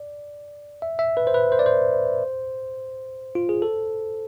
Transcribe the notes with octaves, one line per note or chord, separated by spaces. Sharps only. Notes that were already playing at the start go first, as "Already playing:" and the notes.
Already playing: D5
E5
E5
B4
C5
B4
C5
D5
C5
F4
G#4
A4